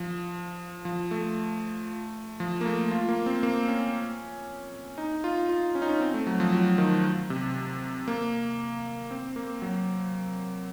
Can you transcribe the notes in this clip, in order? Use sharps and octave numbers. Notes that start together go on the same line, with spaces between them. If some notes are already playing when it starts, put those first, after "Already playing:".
Already playing: F3
F3
A3
F3
A#3
A3
F4
A#3
C4
A#3
C#4
D#4
F4
F4
C#4
D#4
C#4
C4
A3
F#3
F3
F#3
D#3
C3
A#3
C4
A#3
F#3